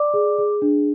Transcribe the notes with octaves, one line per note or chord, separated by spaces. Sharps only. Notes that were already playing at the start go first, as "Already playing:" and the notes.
Already playing: D5 D6
G#4
G#4
D4